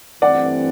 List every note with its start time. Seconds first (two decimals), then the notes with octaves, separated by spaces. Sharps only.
0.22 G2 E3 A3 C4 D5 F#5